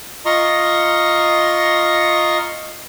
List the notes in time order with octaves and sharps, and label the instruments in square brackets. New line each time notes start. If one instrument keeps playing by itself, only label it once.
[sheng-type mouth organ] F4 D#5 A#5 C6 C#6